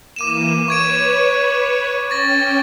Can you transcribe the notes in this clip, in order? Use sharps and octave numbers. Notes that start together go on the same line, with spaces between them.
E3 A#3 D6 D#7 E7
B4 C#5 C#6 G#6 D7
C#4 G5 C#6 A6 A#6